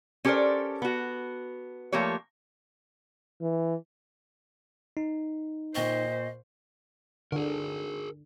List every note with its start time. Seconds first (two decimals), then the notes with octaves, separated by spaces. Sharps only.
0.25 C#4 G4 A4 A#4 C5 D5
0.82 B3 F#4
1.92 F3 A3 A#3 G4 C#5
3.41 E3
4.97 D#4
5.75 A#2 C5 D#5 G5 C#6
7.32 D3 G#4 A#4